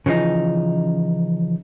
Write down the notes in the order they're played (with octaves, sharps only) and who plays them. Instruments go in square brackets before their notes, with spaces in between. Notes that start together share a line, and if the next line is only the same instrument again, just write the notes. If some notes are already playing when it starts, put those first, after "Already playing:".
[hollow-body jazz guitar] C#3 E3 F3 D#4